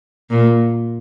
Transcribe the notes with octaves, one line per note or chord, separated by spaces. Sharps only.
A#2